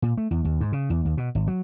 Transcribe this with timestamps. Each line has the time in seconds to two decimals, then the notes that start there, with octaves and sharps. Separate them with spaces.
0.02 A#2
0.18 A3
0.31 E2
0.45 D#2
0.61 G#2
0.73 C#3
0.90 E2
1.05 D#2
1.18 B2
1.35 G#1
1.47 F#3